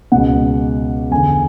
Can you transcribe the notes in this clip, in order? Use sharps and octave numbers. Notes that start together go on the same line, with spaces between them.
C#2 B2 F#5
E2 D3 G#5